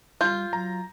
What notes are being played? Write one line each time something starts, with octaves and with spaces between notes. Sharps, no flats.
G3 F4 G6
F#3 A#5